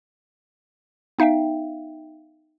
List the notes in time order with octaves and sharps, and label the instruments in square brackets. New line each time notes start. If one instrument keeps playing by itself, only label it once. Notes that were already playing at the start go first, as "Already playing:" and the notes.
[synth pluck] B3 D#4 E5 F5 G5